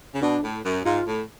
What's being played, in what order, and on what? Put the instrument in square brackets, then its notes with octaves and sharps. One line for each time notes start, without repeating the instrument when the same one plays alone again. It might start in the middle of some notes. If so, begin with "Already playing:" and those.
[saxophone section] C#3
[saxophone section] B2 [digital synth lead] D4
[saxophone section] A2
F#2
[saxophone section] G#2 [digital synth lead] F4
[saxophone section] A2